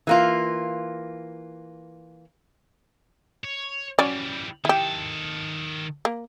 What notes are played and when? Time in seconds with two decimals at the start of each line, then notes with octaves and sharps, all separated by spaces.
0.07 E3 A#3 F4
3.45 C#5
3.99 E3 F#3 G3 C#4 D5
4.65 D#3 E4 G4 A4
6.05 A#3